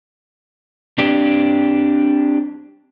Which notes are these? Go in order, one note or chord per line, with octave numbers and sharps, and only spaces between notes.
C4 D4 G4